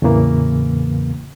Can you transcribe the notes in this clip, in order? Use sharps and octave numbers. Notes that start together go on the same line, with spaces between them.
E2 A2 C#3 E3 A#3